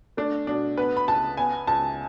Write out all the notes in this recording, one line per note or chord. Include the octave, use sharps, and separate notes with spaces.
A3 D4
B2 D4
B3 B4
B5
C#2 A5
B3 G#5
C#2 A5